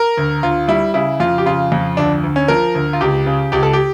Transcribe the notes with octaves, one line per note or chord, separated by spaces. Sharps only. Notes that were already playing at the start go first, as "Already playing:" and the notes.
Already playing: A#4
D2
D2 F4
G3 E4
C#3 E4
F2 F4
G4
C#3 F4
F2
D2 D4
D2
C#4
F3 A#4
D2
F4
C#2 G4
C#3
C#2 G4
A4
G4